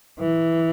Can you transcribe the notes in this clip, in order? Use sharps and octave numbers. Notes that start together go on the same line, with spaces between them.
E3